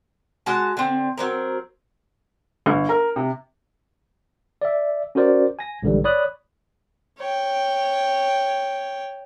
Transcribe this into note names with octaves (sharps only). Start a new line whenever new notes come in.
G#3 F#4 A5
D3 C4
F#3 C4 A#4
G1
A#4
C3
D5 E5
C#4 F#4 A#4 C5 D5
G#5 A#6
A#1 G#2 D3 E3 G3
C#5 D5 B5 D#6 F#6
C#5 G5